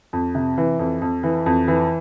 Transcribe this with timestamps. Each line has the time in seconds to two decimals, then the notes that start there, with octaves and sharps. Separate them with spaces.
0.13 F2
0.35 C3
0.58 E3
0.79 F2
1.02 F2
1.23 E3
1.46 F2
1.68 E3